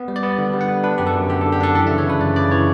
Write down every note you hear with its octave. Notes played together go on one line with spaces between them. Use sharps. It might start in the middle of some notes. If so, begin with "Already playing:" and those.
Already playing: B3
G3
D5
B3
D3
G3
F#5
B3
D4 B4
F#2 G4
A4
F#2
D3 G4
A4
D3
G4
D4 A4
E3 A4
E5
C#3
C#5
C#3 B4
F#2 D5
C#3 D5
E3 C#5